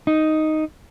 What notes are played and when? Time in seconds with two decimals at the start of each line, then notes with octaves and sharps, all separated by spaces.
0.07 D#4